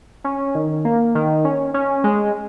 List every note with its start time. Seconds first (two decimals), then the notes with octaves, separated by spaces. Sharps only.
0.24 C#4
0.55 D#3
0.85 A#3
1.15 D#3
1.45 C#4
1.74 C#4
2.04 G#3